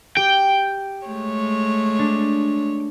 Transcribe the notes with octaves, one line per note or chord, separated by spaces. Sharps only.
G4 G5
G#3 A3 C#5
D4